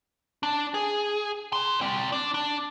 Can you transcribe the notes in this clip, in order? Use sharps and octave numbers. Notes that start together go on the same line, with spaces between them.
D4
G#4
D5 C6
C4 D5
D4
D4